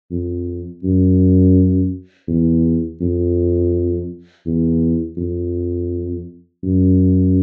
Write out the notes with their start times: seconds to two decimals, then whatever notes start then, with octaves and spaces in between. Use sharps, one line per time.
0.11 F2
0.84 F#2
2.28 E2
3.01 F2
4.46 E2
5.17 F2
6.63 F#2